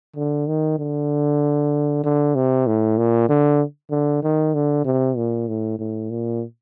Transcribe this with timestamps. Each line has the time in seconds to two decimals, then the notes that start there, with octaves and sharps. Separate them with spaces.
0.16 D3
0.48 D#3
0.79 D3
2.04 D3
2.35 C3
2.67 A2
2.98 A#2
3.29 D3
3.91 D3
4.23 D#3
4.54 D3
4.85 C3
5.17 A#2
5.48 A2
5.79 A2
6.10 A#2